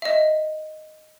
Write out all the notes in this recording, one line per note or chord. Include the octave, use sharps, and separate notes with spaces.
D#5 E5